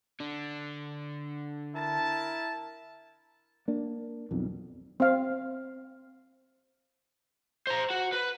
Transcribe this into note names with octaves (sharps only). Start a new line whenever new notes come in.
D3 D4
E4 A#4 A5
A#3 D4
B1 F2
C4 F5
C5 A#5
F#4
B4